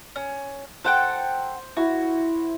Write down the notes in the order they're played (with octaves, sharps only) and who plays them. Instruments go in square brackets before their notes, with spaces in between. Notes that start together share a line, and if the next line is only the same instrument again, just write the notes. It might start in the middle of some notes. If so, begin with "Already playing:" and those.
[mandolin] C#4
[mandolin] A4 F#5 G5 [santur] C5
[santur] E4 [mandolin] F#4